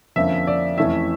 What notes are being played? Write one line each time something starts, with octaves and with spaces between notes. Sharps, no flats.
F2 D3 F3 A#3 C#4 E5
D5
F2 E3 A3 C#4 E5